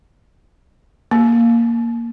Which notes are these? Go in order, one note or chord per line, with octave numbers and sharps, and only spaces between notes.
A#3